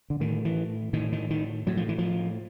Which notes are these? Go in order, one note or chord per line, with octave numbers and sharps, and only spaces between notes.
D3
A2 D#3
E3
A2 D#3
D#3
D#3
A2 F#3
F3
E3
F3